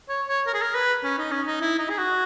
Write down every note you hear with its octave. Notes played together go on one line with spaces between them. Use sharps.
C#5
C#5
A#4
G#4
A#4
B4
C#4
D#4
C#4
D#4
E4
D#4
G#4
F#4